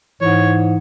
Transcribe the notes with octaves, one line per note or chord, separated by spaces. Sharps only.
G#2 E3 C#5